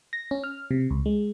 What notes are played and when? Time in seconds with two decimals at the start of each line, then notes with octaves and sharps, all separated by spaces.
0.13 A#6
0.31 C#4
0.44 F6
0.71 C3
0.91 C#2
1.06 G#3